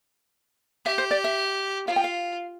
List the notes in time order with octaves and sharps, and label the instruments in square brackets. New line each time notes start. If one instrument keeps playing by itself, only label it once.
[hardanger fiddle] G4 [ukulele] E5
[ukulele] C5
D5
E5
[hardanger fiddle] F4 [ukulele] F5
[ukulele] G5
F5